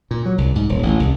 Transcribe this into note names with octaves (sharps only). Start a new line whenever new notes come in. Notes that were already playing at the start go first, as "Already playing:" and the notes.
A#2
F#3
C2
G#2
D#1
A1
C2